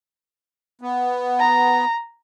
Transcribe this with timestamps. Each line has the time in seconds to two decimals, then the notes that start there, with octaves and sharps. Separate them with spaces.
0.81 B3
1.39 A#5